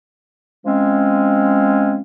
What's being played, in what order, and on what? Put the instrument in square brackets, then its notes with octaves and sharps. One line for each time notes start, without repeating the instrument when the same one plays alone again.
[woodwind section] F3 G#3 C4 C#4